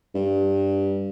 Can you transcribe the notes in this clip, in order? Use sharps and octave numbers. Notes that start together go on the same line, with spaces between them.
G2